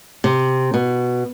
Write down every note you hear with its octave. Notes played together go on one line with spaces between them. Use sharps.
C3
B2